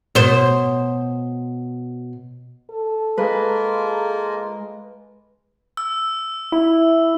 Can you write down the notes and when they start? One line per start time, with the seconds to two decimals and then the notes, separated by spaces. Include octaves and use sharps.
0.15 B2 C5
2.71 A4
3.18 G#3 A#3 F4 A#4 B4
5.77 E6
6.52 E4